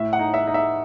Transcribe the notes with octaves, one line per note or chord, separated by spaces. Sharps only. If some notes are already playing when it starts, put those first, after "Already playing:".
Already playing: A2 E5
F#5
D#4
E5
D#4
E5